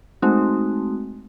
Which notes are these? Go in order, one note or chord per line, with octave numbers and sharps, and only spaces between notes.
G#3 A3 C4 D#4 F#4